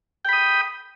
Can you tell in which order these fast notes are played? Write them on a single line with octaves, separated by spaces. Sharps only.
G5 B5 D#6